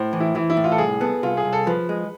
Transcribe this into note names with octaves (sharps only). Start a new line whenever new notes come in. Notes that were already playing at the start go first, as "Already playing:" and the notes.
Already playing: A2 C5
E3
E4
E3 E4
E4
A2
F4
A4
C2 G#4
B3 A4
C2 F4
G#4
C2
A4
F3 B4
G#3